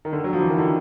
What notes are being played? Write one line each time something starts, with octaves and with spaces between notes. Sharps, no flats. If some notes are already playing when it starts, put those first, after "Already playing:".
D#3
D3
F#3
F3
E3
D#3
D3